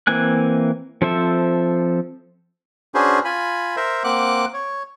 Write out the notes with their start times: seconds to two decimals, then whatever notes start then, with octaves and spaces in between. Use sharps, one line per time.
0.07 E3 A#3 C4 G#5 F#6
1.02 F3 C4 A4 C5 E5
2.94 C#4 D4 F#4 G#4 B4 C5
3.25 F4 G#5 B5
3.76 A#4 C5 E5
4.04 A#3 C4 F#5 D6 F#6
4.54 C#5